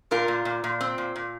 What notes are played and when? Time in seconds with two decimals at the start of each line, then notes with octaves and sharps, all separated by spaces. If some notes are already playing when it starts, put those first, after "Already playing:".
0.11 A#2 F4 A#4
0.28 A#2
0.45 A#2
0.64 A#2
0.81 C4
0.98 A#2
1.16 A#2